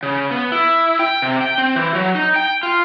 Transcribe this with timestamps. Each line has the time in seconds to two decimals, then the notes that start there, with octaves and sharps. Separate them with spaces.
0.03 C#3
0.31 B3
0.52 E4
0.99 G5
1.22 C3
1.41 G5
1.58 C4
1.76 E3
1.95 F#3
2.15 D#4
2.36 G5
2.63 F4